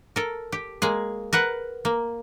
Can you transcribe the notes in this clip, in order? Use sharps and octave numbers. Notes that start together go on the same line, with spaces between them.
A4 A#4
G4
G#3 A#3 G#4
A#4 B4 F#5
A#3